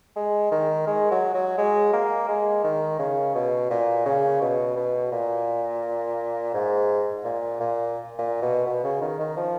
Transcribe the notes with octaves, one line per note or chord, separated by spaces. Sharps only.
G#3
D#3
G#3
F#3
F#3
G#3
A#3
G#3
D#3
C#3
B2
A#2
C#3
B2
B2
A#2
G#2
A#2
A#2
A#2
B2
B2
C#3
D#3
D#3
F3